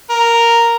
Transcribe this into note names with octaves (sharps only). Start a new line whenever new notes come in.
A#4